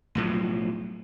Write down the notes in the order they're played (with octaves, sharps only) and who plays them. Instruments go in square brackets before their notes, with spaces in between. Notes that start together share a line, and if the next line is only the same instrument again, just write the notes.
[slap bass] B1 A2 F3 F#3